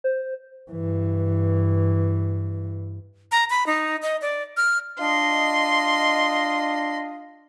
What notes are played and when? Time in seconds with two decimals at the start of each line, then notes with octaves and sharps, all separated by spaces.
0.04 C5
0.72 G2 E3
3.32 A#5
3.50 B5
3.67 D#4
4.02 D#5
4.22 D5
4.57 F6
5.00 D4 F4 D#5 C6